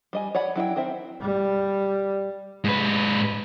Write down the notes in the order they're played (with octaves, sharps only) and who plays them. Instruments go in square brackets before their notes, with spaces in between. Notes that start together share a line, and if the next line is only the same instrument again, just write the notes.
[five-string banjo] G3 D#5 G#5
C#5 D5 F#5 B5
F#3 E4 A4 G5
D#3 C4 C5 E5
[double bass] G3
[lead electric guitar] G#2 B4